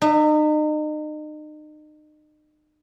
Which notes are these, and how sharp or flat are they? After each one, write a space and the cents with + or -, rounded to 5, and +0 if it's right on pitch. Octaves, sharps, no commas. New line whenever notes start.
D#4 -35 E5 +0